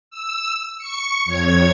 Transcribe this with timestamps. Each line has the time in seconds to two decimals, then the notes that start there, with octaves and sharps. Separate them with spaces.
0.11 E6
0.78 C#6 C#7
1.25 F2 C#5 G#6